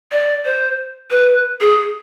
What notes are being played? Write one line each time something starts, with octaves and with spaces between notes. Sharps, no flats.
D5
C5
B4
G#4